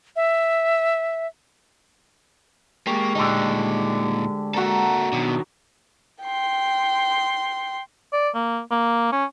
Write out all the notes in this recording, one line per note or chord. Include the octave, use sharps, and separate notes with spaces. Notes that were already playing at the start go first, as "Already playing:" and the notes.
E5
G#3 A#3 G4 A5 C#6
D2 A#2 D3 D#4
A#3 F#4 A4 E5 A#5
B2 D#3 F#3 D4
G5 C6
D5
A#3
A#3
C#4